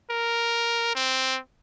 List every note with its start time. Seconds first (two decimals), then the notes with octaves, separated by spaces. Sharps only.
0.10 A#4
0.95 C4